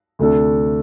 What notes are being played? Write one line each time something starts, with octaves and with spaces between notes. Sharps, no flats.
D2 C3 A3 D4 A4